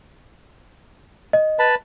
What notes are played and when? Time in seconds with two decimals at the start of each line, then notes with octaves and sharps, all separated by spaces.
1.33 D#5
1.59 B4 A5 B5